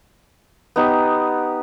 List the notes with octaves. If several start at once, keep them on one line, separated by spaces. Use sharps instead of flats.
B3 D#4 G4